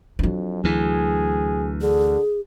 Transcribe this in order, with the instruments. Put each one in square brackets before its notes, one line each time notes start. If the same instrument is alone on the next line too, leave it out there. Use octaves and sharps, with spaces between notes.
[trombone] F2 [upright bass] F#3 D4
[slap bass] D2 E3 [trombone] G#4
[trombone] D3 [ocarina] G#4